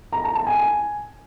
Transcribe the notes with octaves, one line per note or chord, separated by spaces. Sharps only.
A#5
A5
A5
G#5
G#5